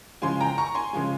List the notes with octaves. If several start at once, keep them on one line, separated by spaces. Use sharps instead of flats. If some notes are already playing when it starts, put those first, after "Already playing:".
C#3 F3 G#3 G#5 C6
G5 A#5
A#5 C#6
G#5 C6
C#3 F3 G#3